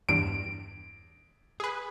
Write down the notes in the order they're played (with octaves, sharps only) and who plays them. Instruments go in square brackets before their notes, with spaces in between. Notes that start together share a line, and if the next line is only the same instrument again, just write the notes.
[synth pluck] E2 G2 [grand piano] D7
[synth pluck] G#4 B4